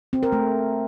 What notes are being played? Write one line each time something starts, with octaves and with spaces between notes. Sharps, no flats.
C4
A#4
A3